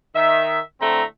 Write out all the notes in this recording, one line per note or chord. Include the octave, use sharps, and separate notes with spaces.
D#3 E5
A2 D3 A3 C4 A#5